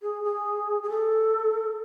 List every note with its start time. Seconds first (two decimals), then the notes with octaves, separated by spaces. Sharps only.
0.02 G#4
0.24 G#4
0.83 G#4
0.89 A4